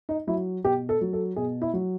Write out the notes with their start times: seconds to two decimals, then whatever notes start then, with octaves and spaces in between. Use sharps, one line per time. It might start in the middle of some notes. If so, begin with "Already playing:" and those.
0.09 D#4
0.27 F#3 E4
0.64 B2 G4
0.89 A4
1.01 F#3
1.13 A4
1.36 B2 G#4
1.62 E4
1.73 F#3